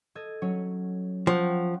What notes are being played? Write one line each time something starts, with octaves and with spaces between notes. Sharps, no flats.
A4 D#5 G#6
F#3 C#4 C#5
F3 F#5 G5 C#6